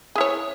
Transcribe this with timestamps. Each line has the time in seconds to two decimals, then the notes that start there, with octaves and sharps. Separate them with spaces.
0.15 G#4
0.18 E4
0.21 C#5